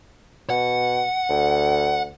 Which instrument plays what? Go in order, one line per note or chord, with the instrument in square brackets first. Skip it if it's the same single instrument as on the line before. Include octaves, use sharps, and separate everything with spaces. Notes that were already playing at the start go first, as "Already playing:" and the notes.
[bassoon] B2 [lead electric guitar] F#5
[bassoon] D2